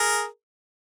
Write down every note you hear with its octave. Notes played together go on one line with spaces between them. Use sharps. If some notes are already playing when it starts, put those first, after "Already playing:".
Already playing: G#4 A#4